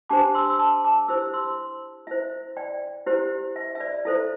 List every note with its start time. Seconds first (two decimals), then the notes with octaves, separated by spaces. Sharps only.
0.09 D4 G4 C5 A5 D6
0.34 C6 E6
0.50 E6
0.59 A5 D6
0.84 A5 D6
1.08 E4 G4 C5 E6
1.34 C6 E6
2.07 E4 C5 E5
2.57 D5 G5
3.06 E4 G4 C5
3.56 E5
3.75 E5
3.80 D5
4.05 E4 A4 C5 E5